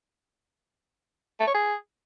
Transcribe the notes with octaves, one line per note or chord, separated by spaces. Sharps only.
A3
C#5
G#4